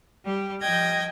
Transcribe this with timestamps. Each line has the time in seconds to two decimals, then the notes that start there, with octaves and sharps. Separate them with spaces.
0.24 G3 G4
0.61 F3 D#5 G5 G6 G#6 A#6